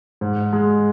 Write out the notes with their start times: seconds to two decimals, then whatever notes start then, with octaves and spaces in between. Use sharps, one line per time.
0.21 G#2
0.53 G#3